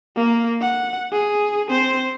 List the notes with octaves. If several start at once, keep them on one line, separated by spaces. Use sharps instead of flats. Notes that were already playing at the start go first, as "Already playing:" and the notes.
A#3 A#4
F#5
G#4
C4 C5